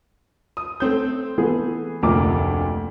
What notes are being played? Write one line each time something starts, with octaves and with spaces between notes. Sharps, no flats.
D#6
A3 C4 G6
E3 A3 B3 G#4
F1 D2 A#2 A#4 D6